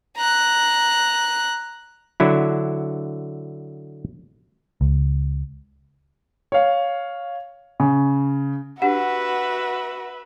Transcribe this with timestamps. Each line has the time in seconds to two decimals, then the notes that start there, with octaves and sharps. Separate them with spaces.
0.16 A#5 F#6
2.20 D3 F#3 E4
4.81 C#2
6.52 C#5 F5
7.80 C#3
8.82 D4 F#4 G4 B4 E5 F#5